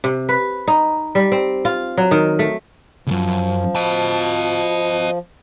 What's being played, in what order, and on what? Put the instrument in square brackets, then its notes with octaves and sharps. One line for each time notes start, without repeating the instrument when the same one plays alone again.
[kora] C3
B4
D#4
G3
C4
F4
F#3
D#3
A3
[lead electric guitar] C#2 F#2 [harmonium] F3
[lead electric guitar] D#5 A5